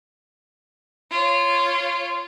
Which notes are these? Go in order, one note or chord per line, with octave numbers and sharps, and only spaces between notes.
F4 C#5